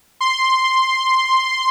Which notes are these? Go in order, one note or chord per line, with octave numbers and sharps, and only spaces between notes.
C6